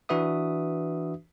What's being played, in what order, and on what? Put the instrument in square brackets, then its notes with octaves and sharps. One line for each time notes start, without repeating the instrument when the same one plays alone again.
[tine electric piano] E3 D4 F#4 B4 E5 D#6